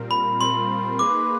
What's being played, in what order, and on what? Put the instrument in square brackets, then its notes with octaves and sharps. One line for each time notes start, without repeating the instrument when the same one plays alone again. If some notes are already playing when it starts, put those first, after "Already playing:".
Already playing: [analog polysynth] A#2 G3 C4 F4 A#4
[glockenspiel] B5
[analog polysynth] A#2 G3 C4 F4 A#4 [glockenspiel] C6
[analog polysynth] A#3 D#4 G#4 B4 [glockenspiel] D6